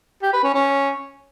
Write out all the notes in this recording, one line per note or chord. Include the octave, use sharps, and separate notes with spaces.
G4
B4
C#4
C#4